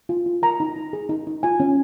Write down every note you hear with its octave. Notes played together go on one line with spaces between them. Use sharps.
F4
F4
A#4 A#5
D#4
D#4
G#4
D#4
D#4
F4 G#5
C#4